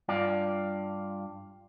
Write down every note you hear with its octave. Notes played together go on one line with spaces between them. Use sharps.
G2 F4 D5